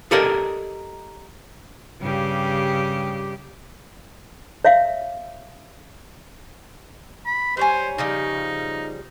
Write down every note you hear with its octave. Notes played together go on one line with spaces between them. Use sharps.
G4 A4 A#4 D5 D#5
G2 C#3 G4
C#5 E5 F5
B5
G3 C5 C#5 G#5
C#3 F3 G3 D#4